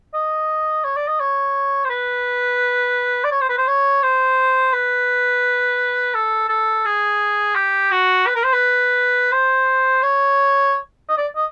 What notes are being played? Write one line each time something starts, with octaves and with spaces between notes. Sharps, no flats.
D#5
C#5
D5
D#5
C#5
C5
B4
D5
C#5
C5
B4
C5
C#5
C5
B4
A4
A4
G#4
G4
F#4
B4
A#4
C5
B4
C5
C#5
D#5
D5
D#5